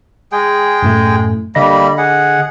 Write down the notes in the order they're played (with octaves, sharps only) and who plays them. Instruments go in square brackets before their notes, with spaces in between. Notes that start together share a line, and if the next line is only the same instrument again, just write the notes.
[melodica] G#3 G#4 G5
[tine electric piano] F#2 A2 A3
[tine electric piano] D3 D#5 A#6 [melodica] G3 A#3 B5
[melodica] G#4 F#5